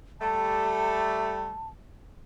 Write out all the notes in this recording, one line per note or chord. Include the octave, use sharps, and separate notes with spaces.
G3 A3 A5